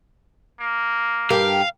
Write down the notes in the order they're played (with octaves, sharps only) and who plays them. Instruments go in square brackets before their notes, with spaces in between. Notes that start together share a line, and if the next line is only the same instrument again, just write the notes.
[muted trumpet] A#3
[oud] G2 G4 A#4 [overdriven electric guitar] F5